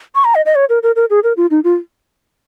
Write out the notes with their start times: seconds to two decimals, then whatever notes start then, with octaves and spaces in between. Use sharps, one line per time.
0.15 C#6
0.24 A#5
0.35 D#5
0.46 D#5
0.55 C#5
0.69 A#4
0.83 A#4
0.96 A#4
1.10 G#4
1.23 A#4
1.37 F4
1.50 D#4
1.64 F4